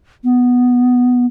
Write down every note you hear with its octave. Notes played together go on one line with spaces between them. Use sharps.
B3